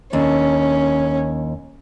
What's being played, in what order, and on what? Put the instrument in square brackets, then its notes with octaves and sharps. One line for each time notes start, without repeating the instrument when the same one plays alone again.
[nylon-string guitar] D#2 D4 [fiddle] C#4